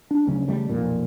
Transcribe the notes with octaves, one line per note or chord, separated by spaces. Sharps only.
D4
D2 C#3 F#3 C#4
C#3 E3 G3 A3
B1 F2 A#2